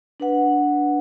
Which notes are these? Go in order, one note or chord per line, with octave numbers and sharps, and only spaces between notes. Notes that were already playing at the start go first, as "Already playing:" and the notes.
D4 B4 F#5